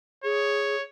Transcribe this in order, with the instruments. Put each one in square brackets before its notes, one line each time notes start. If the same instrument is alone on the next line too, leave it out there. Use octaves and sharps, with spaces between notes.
[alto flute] G#4 [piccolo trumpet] C#5